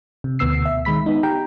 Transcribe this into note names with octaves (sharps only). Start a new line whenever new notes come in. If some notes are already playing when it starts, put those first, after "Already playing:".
C3
D2 B2 B3 E6 C7
E5
D#3 G#3 B5 B6
B3 D#4
G4 G5 A#5